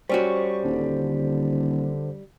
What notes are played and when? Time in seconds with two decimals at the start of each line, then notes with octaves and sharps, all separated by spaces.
0.09 G3 C#4 F#4 C5 C#6
0.64 D#1 D3